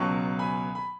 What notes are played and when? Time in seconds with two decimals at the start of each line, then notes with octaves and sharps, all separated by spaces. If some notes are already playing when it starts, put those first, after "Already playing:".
Already playing: C#2 B2 F#3 A5 C#6
0.39 G#5 B5
0.75 B5